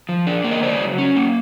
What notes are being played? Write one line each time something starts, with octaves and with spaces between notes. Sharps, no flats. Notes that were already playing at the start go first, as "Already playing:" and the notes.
F3
D4
A#3
D#5
C#3 C5 D5
F#3
C#4
A#3